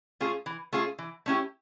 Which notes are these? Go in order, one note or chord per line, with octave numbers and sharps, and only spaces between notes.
A3 C#4 F4 G#4
E3
A3 C#4 F4 G#4
E3
A3 C#4 E4 G4